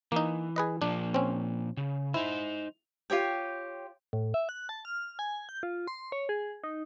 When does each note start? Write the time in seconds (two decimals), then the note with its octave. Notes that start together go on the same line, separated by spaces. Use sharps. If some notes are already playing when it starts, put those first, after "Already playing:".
0.12 E3 A#3 D#4
0.56 G#4 B4 D#5
0.82 A#2 F3 A#3 D4
1.14 C4 C#4
1.77 C#3
2.14 D#4 E4 C5
3.10 F4 G4 C#5 G5
4.13 A2
4.34 E5
4.49 F#6
4.69 A5
4.85 F6
5.19 G#5
5.49 G6
5.63 F4
5.87 C6
6.12 C#5
6.29 G#4
6.64 D#4